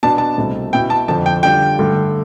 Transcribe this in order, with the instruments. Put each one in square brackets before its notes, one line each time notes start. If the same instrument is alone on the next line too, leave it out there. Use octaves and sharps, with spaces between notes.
[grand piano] B2 B3 D4 [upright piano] A5
[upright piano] A5
[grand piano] C2 B2 A3 C4
[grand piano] B2 B3 E4 [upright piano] G5
[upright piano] A5
[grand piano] F2 D3 F3 [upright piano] A5
[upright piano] G5
[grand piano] D3 G3 D4 F4 [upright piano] G5
[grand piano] G2 D3 A3